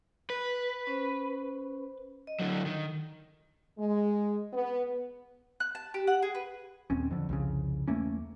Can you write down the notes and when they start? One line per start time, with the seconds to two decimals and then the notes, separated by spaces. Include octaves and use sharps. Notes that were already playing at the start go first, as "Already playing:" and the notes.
0.30 B4
0.87 C#4 C5
2.27 D#5
2.39 D3 F#3
2.66 D#3
3.78 G#3
4.54 B3
5.60 F#6
5.75 A5
5.94 G4
6.07 F#5
6.22 G#4
6.35 B4
6.90 D#1 D#2 C4 C#4
7.11 F2 D3
7.29 C2 F2 C#3
7.88 E2 A3 A#3 C#4